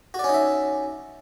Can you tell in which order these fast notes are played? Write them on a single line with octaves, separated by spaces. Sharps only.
F#4 D5 C#4 D#4 E5